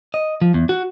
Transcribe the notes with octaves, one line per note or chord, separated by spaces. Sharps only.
D#5
F3
E2
F#4